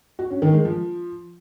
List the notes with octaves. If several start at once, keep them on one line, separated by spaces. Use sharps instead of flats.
F#4
C#4
D#3
G#3
F3